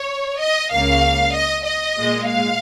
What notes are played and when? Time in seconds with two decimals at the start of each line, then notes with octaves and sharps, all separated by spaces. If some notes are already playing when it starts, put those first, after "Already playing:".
Already playing: C#5
0.40 D#5
0.72 C#2 C#3 A#3 F5
1.34 D#5
1.65 D#5
1.96 A#2 G#3
2.28 F5